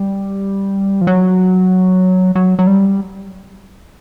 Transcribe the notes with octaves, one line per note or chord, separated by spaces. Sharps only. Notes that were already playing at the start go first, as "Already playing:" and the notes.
Already playing: G3
F3
F#3
F#3
F#3
G3